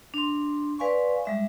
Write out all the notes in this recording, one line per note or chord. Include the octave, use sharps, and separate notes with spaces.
D4 C6
B4 D5 F5 G#5 C6 C#6
G3 G#3 E5